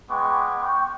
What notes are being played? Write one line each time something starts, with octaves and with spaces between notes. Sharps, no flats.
G#3 B3 G5 C#6 D6
G5 C#6